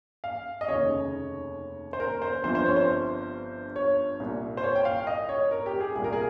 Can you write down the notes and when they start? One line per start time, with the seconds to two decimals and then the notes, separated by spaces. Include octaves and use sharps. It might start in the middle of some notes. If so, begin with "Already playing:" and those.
0.24 F5
0.61 D#5
0.68 F1 D#2 C#3 C#5
1.93 C5
2.00 A#4
2.22 C5
2.43 G1 G2 F3 C4 C5
2.55 C5
2.66 C#5
2.76 C5
3.76 C#5
4.20 C2 A#2 G3
4.57 C5
4.64 C#5
4.75 G5
4.85 F5
5.07 D#5
5.29 C#5
5.51 A#4
5.66 G4
5.80 G#4
5.95 C2 A#2 G3 A#3 G#4
6.04 A#4
6.13 G#4